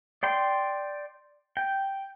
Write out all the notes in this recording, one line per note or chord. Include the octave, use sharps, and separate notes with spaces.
D5 G5 C6
G5